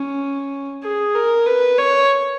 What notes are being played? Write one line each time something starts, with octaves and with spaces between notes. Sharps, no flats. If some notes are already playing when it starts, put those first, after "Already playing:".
Already playing: C#4
G#4
A#4
B4
C#5